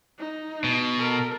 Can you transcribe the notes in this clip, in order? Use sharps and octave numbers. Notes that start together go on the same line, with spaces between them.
D#4
B2
A4 A#4